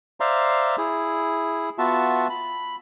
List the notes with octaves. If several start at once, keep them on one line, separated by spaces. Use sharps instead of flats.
C5 D5 E5 F5 A#5 C6
E4 G#4
B3 F4 F#4 E5 A5
B5